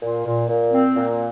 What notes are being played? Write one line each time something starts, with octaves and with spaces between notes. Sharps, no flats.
A#2
A#2
A#2
C4
A#2